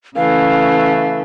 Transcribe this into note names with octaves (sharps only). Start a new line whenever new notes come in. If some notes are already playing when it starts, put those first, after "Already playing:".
C#3 E3 A3 F5